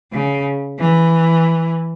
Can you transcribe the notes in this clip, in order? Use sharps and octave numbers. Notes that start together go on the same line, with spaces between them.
C#3
E3